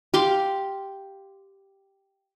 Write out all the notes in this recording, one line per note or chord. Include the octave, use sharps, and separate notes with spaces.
G4 F5 C6 D6